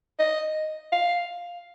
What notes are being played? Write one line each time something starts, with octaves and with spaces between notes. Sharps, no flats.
D#5
F5